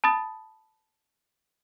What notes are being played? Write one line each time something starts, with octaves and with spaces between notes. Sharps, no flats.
A5 B5 D#6 A6